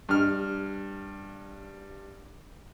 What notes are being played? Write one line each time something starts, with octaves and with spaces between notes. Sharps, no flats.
G2 F6